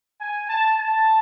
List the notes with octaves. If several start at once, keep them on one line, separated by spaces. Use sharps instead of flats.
G#5
A5
A5